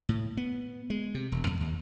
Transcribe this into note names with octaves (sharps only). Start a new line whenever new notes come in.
A2
B3
G#3
C3
E1
F2
D#2